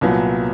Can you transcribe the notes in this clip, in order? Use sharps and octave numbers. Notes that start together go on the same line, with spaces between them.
C2 A#2 F#3 B3